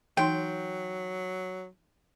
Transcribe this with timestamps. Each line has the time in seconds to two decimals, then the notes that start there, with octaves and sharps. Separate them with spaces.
0.17 E3 F#3 D#4 G5 C6